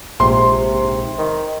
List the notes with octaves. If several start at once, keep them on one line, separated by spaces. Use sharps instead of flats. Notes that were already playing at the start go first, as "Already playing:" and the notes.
A#1 G#2 C3 C6
D#3